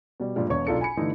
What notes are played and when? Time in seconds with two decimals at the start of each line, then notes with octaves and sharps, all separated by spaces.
0.20 B2 G3
0.36 G2 A#2 F3 G3 G#3
0.50 E1 E2 C#5 C#6
0.67 B1 D4 F4 A4 C#7
0.81 G#5 B5 C#7
0.97 G2 D3 E3 A3 D#4 E4